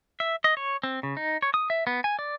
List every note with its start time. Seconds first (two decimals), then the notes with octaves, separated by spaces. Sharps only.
0.20 E5
0.44 D#5
0.57 C#5
0.83 C4
1.03 C#3
1.17 D#4
1.42 C#5
1.54 D#6
1.70 E5
1.87 B3
2.04 G#5
2.19 D5